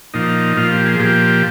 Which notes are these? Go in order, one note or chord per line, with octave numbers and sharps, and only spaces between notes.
A#2 F3 D#4
A#2 F3 F4
G4
G#4
A#2 F3 G4